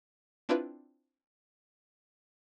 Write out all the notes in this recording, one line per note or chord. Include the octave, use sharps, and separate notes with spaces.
C4 D4 E4 F4 B4